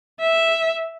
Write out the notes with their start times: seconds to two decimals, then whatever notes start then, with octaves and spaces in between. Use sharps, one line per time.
0.20 E5